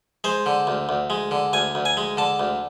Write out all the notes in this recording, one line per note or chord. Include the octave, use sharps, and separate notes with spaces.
G#3 C5
D3
D2
D2
G#3
D3
D2 G#5
D2
G#5
G#3
D3 A5
D2